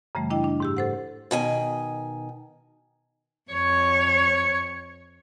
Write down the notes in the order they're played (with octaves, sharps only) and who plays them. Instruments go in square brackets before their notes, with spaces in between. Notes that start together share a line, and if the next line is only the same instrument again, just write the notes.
[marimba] F#2 C#3 E3 G3 A3
D4 E4 D#5 G5
D4
G#2 G4 E6
A4 C5 F#5
[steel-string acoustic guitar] B2 D#3 G#5
[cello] F2 C#5